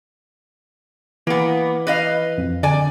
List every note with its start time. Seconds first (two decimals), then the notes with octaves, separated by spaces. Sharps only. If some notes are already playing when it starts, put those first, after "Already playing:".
1.27 E3 A#3 B3
1.87 B4 D#5 F5
2.38 F2
2.63 D3 D5 G#5